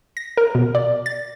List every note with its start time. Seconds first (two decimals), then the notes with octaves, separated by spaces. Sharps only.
0.17 A#6
0.37 A#4
0.55 B2
0.75 D5
1.06 A6